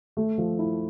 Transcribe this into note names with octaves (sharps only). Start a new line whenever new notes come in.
A3
F3
E4